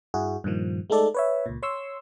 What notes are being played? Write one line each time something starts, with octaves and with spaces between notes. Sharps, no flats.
G2 E4 F#4 G#4
G2 A#2 D#3 F3
G#3 A3 D#4 A4 D5
B4 C#5 E5
C#2 A#2
C#5 C6 C#6 E6